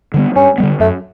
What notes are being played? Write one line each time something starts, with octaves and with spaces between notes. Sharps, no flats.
D3 G3 B3
G2 C#4
D3 G3 B3
F#2 A3